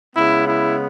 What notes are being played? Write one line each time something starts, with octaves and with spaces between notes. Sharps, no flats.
C#3 G#3 B3 E4
E4